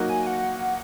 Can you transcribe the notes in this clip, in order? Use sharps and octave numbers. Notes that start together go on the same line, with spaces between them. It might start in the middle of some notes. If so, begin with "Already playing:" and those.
Already playing: F#3 A#3 D#4 F#4
G#5
F#5